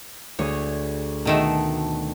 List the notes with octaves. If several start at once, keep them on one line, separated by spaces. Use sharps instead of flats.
D2 G#4 C#5
B2 D#3 A3 A5 E6